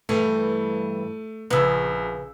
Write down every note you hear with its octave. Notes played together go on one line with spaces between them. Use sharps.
G2 E3 G3 A3
A#1 C#3 B4 E6